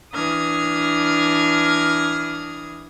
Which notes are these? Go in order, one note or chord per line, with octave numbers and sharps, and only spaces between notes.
E3 D4 D#6 F6 G#6 A#6